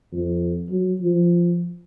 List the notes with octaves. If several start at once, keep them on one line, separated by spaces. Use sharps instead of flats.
F2
F#3
F3